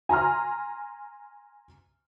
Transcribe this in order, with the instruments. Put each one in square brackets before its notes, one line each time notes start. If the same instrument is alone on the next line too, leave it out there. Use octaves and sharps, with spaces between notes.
[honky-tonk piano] G#5 A#5 C6 F6